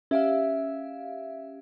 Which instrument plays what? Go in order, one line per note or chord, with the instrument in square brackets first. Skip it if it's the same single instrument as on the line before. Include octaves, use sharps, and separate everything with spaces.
[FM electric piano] C#4 G4 F5 [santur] E5